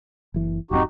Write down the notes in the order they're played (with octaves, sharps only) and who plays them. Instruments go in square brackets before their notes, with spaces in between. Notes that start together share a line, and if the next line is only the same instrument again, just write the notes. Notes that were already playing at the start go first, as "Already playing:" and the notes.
[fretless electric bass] F#1 E3
[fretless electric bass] D1 F#2 C4 [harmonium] D#4 F#4 G4